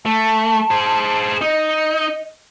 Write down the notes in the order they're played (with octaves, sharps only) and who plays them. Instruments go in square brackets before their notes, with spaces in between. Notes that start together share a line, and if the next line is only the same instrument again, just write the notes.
[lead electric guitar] A3 [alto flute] A5
[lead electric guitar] G#4 C5
[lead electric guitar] D#4 [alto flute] D#5